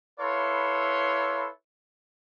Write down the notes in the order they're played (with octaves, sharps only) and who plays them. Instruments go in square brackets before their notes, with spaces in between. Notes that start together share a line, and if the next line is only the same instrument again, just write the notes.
[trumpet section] E4 A4 B4 C#5 F5 C6